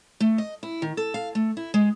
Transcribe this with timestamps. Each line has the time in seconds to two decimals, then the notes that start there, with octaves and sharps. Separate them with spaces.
0.20 A3
0.38 D#5
0.63 E4
0.82 D#3
0.97 A4
1.14 F5
1.35 A3
1.57 E4
1.74 G#3